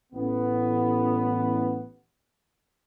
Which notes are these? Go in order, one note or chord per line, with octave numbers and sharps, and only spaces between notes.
A1 B3